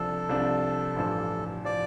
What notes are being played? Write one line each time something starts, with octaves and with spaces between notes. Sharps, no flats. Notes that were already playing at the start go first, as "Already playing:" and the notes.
Already playing: C2 C3 F3 D4 A4
C2 C3 F3 D4
A1 G2 F3
F3 D5